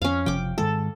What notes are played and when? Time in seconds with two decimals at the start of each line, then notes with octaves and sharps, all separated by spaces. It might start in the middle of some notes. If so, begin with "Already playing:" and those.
0.02 F2 C#4 F5
0.26 F#1 C3 F3 G5 D6
0.58 G#2 D#3 G#3 A4